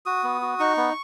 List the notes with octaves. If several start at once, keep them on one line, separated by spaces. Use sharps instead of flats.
F#4 D#6
B3
F#4
D#4 C#6
B3